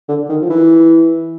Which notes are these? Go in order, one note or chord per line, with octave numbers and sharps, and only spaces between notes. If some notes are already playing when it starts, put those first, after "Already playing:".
D3
D#3
F3
E3